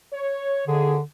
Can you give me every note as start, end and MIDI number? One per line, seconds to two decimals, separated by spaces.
0.13 0.64 73
0.68 0.95 39
0.68 1.01 50
0.68 0.95 68